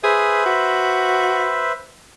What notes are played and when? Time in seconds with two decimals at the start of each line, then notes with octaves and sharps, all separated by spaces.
0.04 G#4 B4 C5 E5
0.46 F#4